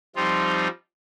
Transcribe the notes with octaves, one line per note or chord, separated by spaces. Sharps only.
F3 G3 C4 D#4 F4